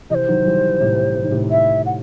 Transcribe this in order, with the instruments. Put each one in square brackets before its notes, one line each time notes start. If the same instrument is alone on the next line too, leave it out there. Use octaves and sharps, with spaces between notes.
[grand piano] C3 E3 [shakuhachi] D#5
[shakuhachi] C5
[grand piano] D#3 F#3
E3 G3
A2 C3
C3
D#3
A2 C3
[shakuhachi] E5
F#5